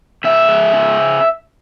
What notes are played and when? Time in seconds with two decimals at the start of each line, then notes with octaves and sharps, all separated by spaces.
0.24 C#3 E5
0.49 G#3
0.73 C#3